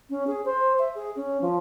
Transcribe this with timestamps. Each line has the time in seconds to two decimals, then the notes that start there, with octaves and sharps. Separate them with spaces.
0.09 C#4
0.27 G#4
0.45 C5
0.79 E5
0.95 G#4
1.16 C#4
1.41 F3